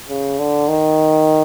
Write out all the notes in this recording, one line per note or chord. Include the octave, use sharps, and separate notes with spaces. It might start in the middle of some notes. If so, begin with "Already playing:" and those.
C#3
D3
D#3